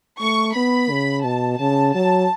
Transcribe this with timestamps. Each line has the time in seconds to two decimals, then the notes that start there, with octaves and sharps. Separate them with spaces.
0.21 A3 C#6
0.56 B3 B5
0.90 C#3
1.24 B2 A5
1.60 C#3 A5
1.94 F#3 A5